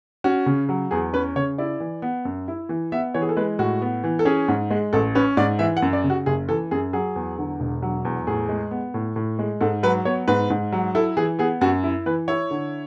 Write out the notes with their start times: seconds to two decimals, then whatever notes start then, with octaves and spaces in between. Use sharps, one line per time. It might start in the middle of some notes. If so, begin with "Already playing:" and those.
0.24 C#4 F#4
0.46 C#3
0.69 F#3
0.91 E2 G#4
1.13 C#4 B4
1.36 C#3 C#5
1.58 E4 D5
1.80 E3
2.02 B3
2.25 F#2
2.48 E4
2.69 E3
2.92 B3 E5
3.14 E3 C#5
3.22 G#4
3.29 A4
3.37 G#3 B4
3.59 A2 F#4
3.82 B3
4.04 E3
4.19 A4
4.25 C#4 G#4
4.48 G#2
4.71 G#3
4.93 A1 A4
5.15 C#4 B4
5.37 G#2 D5
5.59 E3 E5
5.77 F#5
5.82 F#2
5.93 D5
6.04 C#3
6.10 F#4
6.26 F#1 G#4
6.49 E3 A4
6.71 F#2 G#4
6.93 F#3 G#4
7.16 E2
7.38 D3
7.60 E1
7.82 F#3
8.05 E2
8.27 A2 G#4
8.49 G#3
8.71 B3
8.94 A2
9.16 A2
9.39 G#3
9.61 G#2 A4
9.83 F#3 B4
10.05 B3 C#5
10.28 G#2 B4
10.50 G#2
10.72 F#3
10.95 E4 A4
11.17 E3 G#4
11.39 B3 G#4
11.61 F#2 F#4
11.83 E4
12.06 E3 B4
12.28 E4 C#5
12.51 D3